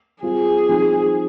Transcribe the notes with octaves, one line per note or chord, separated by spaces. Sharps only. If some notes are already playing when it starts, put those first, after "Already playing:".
G3 C4 F4 G#4
F3 C4 D#4